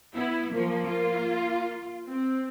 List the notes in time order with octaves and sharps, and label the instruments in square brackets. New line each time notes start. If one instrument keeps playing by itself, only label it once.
[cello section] B3 [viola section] E4
[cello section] F3 F#3 [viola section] A#3
[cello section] F4
[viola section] C4